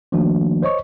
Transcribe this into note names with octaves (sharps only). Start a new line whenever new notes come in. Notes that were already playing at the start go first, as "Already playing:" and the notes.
D#3 F3 A3 A#3 D4 F#4
C5 C#5 D#5 C#6